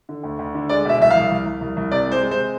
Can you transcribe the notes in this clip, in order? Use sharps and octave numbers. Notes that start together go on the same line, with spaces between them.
D3
D2
D2
D3
G#3 D5
B2 E5
C2 E5
C2 F5
C2
C2
C2
C2
C3 D5
G#3
C5
G#3
C5
C3